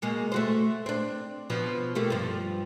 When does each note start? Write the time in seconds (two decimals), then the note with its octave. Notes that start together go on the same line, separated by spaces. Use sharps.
0.02 B2 G#3 A#3
0.32 A3 F#4 C5
0.86 C4 D4
1.50 B2 F3 B3
1.95 A3 A#3 G4
2.10 G2 F3